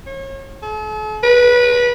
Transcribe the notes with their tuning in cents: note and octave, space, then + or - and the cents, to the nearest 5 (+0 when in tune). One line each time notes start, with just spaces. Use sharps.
C#5 -35
A4 -45
B4 -20